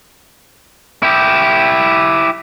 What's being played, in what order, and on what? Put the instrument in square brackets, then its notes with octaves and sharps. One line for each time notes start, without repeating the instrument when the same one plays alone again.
[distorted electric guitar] E4 G4